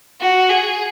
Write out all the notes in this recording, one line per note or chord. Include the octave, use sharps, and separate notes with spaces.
F#4
G#4